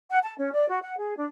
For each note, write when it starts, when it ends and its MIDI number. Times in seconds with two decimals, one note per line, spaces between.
0.10 0.19 78
0.23 0.33 81
0.39 0.53 61
0.53 0.66 74
0.68 0.78 66
0.83 0.95 78
0.98 1.16 68
1.17 1.25 62